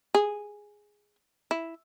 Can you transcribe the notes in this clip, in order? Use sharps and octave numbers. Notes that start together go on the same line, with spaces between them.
G#4
E4